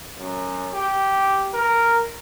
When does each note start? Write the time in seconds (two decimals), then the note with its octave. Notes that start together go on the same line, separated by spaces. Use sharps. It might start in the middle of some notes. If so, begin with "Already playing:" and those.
0.19 F#2
0.74 G4
1.54 A#4